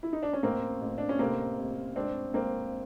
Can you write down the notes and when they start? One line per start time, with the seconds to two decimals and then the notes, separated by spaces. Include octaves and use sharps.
0.03 E4
0.13 D#4
0.23 D4
0.33 C#4
0.43 A1 A#3 C4
0.81 A1
0.98 D4
1.09 C#4
1.19 F1 A#3 C4
1.58 F1
1.96 G#1 C4 D4
2.34 G#1 A#3 C4